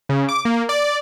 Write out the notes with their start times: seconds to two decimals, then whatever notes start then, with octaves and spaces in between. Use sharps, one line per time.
0.09 C#3
0.29 D6
0.45 A#3
0.69 D5